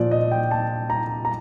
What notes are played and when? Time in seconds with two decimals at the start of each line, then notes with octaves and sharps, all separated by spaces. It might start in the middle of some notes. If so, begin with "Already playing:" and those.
Already playing: A#2 F3 D5
0.11 D#5
0.31 G5
0.51 A5
0.90 A#5
1.25 A#5